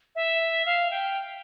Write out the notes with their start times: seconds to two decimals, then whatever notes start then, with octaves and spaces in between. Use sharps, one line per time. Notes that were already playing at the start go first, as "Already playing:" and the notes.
0.15 E5
0.65 F5
0.91 G5